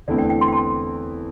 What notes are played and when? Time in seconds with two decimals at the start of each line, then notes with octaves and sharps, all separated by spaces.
0.08 E2 D3 A3 C4 E4 D5
0.18 G5
0.30 G5
0.41 C6
0.48 G5
0.53 A5